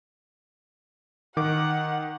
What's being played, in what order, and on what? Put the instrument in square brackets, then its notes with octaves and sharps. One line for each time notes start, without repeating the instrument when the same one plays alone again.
[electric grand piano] D#3 D6 [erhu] F#5